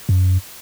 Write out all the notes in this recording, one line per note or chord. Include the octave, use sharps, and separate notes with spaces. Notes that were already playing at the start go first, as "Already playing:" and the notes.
F#2